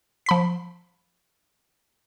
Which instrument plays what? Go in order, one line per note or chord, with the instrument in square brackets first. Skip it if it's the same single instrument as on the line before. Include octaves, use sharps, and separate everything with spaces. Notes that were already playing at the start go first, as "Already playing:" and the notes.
[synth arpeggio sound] F3 B5 B6